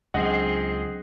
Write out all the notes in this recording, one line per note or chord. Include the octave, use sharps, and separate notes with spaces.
C#2 F#3 C4 D4 G#4 D#5 F#5